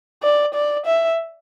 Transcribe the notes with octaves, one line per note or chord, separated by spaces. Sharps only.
D5
D5
E5